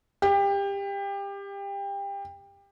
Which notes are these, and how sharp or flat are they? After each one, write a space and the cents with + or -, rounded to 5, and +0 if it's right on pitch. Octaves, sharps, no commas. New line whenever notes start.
G4 +25